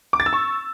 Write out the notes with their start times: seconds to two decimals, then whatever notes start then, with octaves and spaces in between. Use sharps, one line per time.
0.13 D6
0.20 A6
0.26 E6
0.33 C#6